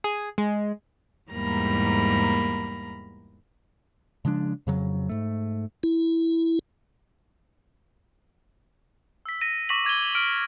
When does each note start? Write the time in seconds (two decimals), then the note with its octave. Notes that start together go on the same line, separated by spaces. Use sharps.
0.04 G#4
0.38 G#3
1.30 E2 G#2 G3 A#3 A#5 B5
4.25 C#3 F3 G#3 D4
4.67 F2 C#3 F#3
5.09 G#2 A3
5.83 E4
9.26 E6 B6
9.41 A#6 D#7
9.69 C#6 D6 A#6 B6 D#7 F#7
9.85 D6 G#6 D#7 G7
10.15 F6 D7